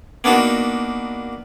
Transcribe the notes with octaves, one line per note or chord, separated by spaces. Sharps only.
A#3 B3 D4 D#4 F#4